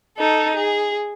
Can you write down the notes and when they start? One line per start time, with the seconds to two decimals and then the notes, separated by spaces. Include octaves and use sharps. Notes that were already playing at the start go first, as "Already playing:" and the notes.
0.17 D#4 A4
0.56 G#4